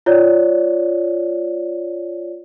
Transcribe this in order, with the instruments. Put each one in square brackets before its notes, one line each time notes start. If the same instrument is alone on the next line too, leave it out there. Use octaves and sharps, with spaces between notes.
[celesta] F4 C#5 D5